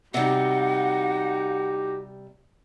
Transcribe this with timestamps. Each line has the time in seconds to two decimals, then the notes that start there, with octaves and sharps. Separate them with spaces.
0.14 C3 G3 D#4 F#4 G4 F#5